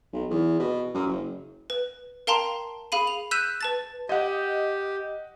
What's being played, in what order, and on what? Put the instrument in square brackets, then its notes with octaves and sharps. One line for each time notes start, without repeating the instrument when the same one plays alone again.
[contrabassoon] B1
E2
B2
F#2
F#1
[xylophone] B4
A#4 F5 G5 A5 A#5 C6
G#4 F5 B5 D#7
F7
E6 F#6 G6 B6 D#7 E7
B4 A5 A6
[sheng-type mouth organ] G4 [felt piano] D#5 F#5